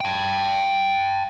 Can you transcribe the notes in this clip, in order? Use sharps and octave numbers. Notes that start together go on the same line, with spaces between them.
G5 A5